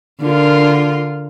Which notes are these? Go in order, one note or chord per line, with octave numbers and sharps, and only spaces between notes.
D3 F4 A#4